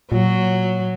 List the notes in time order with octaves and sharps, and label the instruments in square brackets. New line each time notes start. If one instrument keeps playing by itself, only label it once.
[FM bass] A#2 [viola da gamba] F#3